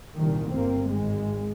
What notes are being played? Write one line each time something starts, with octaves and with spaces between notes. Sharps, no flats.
C2 A#2 D#3
G1 A#3 C4
G#1 G#3